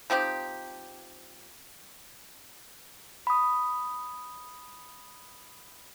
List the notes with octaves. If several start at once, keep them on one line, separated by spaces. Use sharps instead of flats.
F3 C4 D#4 G4
B5 D#6